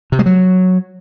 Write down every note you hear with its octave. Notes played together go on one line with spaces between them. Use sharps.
C3
G#3
F#3